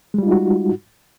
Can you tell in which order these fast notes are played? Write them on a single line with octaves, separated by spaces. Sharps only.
G#3 G3 F4 D#4 F#4